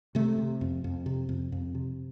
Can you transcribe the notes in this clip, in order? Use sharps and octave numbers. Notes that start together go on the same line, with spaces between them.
C3 A3
C3
F2
F2
C3
F2
F2
C3